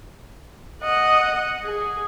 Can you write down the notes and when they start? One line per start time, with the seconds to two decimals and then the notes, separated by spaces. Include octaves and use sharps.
0.83 D#5 F#5
1.65 G#4